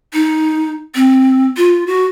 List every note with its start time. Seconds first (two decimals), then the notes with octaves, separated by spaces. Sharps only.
0.14 D#4
0.95 C4
1.57 F4
1.87 F#4